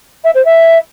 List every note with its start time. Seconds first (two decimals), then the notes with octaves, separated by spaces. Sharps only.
0.24 E5
0.34 C5
0.45 E5